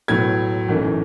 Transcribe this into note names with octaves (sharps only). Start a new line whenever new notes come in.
B1 A2 F#3 B3 G#6
G#1 F#2 E3 A3